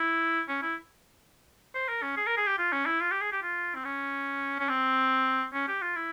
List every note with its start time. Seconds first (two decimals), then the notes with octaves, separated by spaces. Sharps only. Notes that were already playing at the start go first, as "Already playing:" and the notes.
Already playing: E4
0.48 C#4
0.62 E4
1.74 C5
1.88 A#4
2.02 C#4
2.16 G#4
2.27 A#4
2.37 G#4
2.47 G4
2.58 F4
2.72 C#4
2.86 E4
3.01 F4
3.11 G4
3.21 G#4
3.32 G4
3.43 F4
3.75 C4
3.85 C#4
4.59 C#4
4.69 C4
5.53 C#4
5.68 G4
5.82 F4
5.96 E4